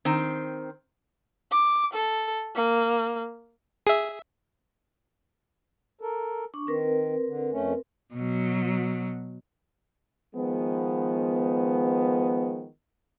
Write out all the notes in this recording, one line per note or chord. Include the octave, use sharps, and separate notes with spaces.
D#3 C4
D6
A4
A#3
G#4 E5
A4 A#4
D4 C#6
D#3 C4 A#4 B4
D3
F2 A3 C#4
B2 F#3
D#3 F3 G#3 B3